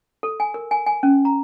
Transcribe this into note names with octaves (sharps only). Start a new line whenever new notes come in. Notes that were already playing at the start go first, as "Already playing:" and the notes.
A4
G#5
A#4
G#5
G#5
C#4
A#5